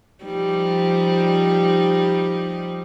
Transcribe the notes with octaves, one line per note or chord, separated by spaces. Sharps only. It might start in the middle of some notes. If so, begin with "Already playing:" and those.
F3 G3 D#4